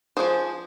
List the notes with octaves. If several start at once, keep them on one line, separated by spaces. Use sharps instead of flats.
F3 A#3 G#4 C5